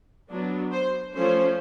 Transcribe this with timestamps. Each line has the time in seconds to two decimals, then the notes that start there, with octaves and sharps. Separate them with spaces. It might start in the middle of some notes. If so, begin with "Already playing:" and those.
0.30 F#3 B3 D4
0.72 C5
1.15 F3 A3 C#4 C5